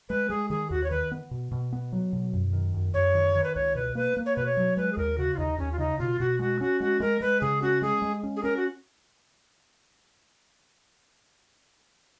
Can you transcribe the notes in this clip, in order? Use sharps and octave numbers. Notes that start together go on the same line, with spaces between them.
G#3 B4
G#3 G#4
D#3 G#4
D#2 F#4
C#5
D#3 B4
B3
B2
B2
B3
F#3
B2
F#2
D#3
F#2
F#2 C#5
D#3
D#3
B4
C#2 C#5
B2 B4
A#3 B4
A#3
C#5
B2 B4
C#5
F#3
G#3 B4
G#4
D#2 A#4
C#3 F#4
F4
D#2 D#4
D#2 C#4
F4
C#3 D#4
B2 F4
B2 F#4
G#3 F#4
C#4 F#4
G#3 F#4
G#3 A#4
G#3 B4
C#3 G#4
C#4 F#4
G#3 G#4
G#3
C#4
G#4
C#4 A#4
F#4